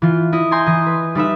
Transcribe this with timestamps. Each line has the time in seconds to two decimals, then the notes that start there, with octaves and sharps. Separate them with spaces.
0.02 E3 F4
0.32 E4 D#5
0.51 G#5 A#5 C6 G6
0.66 E3 D#5
0.86 B4
1.15 G3 D#4 B4 E5